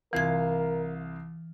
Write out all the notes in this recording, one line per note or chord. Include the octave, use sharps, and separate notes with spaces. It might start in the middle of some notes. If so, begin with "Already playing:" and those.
C2 E3 F4 A#4 F5 G#6